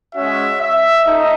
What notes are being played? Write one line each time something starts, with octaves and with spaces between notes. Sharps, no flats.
G#3 C#4 F#4 E5
E5
A3 D#4 D#5